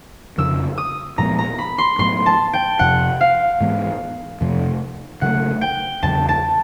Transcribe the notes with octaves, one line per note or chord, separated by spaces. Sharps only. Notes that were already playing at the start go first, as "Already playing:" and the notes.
F2 C#3 F3 E6
D#6
A#2 F3 G#3 B3 A#5
A#5
B5
C6
A2 F#3 B3 C6
A5
G5
F2 C3 F3 F#5
F5
G#2 E3 G#3 B3
F2 C3 F3 A3
C#3 F#3 A3 F#5
G5
E2 C#3 F#3 A5
A5